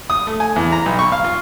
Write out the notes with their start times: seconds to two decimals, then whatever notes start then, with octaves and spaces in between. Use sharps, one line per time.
0.10 D#6
0.27 A3
0.40 G#5
0.56 E2
0.72 A#5
0.86 B1
0.99 C#6
1.12 F5
1.24 F4